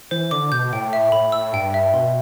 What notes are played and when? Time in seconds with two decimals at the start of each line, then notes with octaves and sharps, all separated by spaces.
0.11 E3 C5
0.31 D3 D6
0.52 B2 G6
0.72 A2 G5
0.93 E5
1.12 A2 B5
1.32 E6
1.53 G2 G5
1.74 E5
1.94 B2 C6